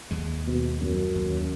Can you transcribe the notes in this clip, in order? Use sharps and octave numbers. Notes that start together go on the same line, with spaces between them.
D#2 G#3
B2
F#2
D#2